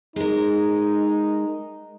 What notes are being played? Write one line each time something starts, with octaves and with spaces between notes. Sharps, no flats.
G#3 D#4 A#4